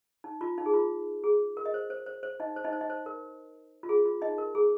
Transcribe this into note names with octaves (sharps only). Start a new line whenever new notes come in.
D#4
F4
D#4
G#4
F4
G#4
A#4
D#5
C5
C5
C5
C5
D#4 D#5
C5
D#4 D#5
C5
D#4 D#5
C5
A#4
F4
G#4
F4
D#4 D#5
A#4
G#4